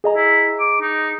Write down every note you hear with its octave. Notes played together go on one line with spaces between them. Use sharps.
G#4 D#5 A#5
E4
D6
D#4